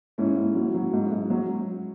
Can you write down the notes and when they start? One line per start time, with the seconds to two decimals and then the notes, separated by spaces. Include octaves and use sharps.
0.18 G#2 C#4 E4
0.37 G#2
0.55 F#3
0.74 F#3
0.93 G#2
1.12 G#2
1.30 F#3